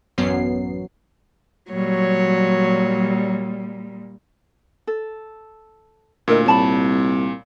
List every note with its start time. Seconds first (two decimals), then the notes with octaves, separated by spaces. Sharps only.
0.18 A1 F#2 F#3 B3 C7
1.71 A#2 F#3 G3 C#5
4.87 A4
6.28 D2 A#2 E4 A#4 D#5
6.46 C2 C#5 A5 B5